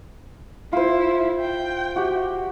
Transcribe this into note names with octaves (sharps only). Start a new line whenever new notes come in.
E4 F4 C5
G5
F#4 G4